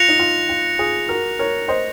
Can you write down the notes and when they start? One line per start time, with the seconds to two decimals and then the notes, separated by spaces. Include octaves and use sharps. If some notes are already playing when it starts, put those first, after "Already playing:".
Already playing: F4 F#6 A#6 C#7 F7
0.09 D#4
0.19 F4
0.49 F4
0.79 F4 G#4
1.09 F#4 A#4
1.39 A#4 C#5
1.68 C5 D#5